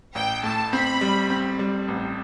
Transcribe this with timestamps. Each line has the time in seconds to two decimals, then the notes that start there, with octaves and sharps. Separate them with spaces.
0.15 A1 G5
0.44 A2 A5
0.72 C4 B5
1.01 G3
1.30 C4
1.59 G3
1.88 A1